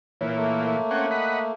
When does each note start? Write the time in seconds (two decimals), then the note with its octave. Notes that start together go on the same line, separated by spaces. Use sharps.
0.21 A#2 E3 C#5
0.36 A3 A#3
0.91 C4 C#4 F#5
1.11 D#5 F#5 B5